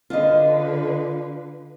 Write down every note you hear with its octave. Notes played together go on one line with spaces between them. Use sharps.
D3 F4 B4 D#5